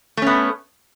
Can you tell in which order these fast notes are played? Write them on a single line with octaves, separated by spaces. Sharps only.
A3 C#4 B3